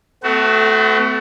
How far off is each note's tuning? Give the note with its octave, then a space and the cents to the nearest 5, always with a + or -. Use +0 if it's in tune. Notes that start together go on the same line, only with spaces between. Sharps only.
A3 +0 C4 -45 F#4 +20